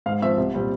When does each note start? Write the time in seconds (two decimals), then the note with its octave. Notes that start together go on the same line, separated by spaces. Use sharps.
0.06 G#2 F5
0.22 F3 C4 E5
0.37 C2
0.53 A#2 G3 C4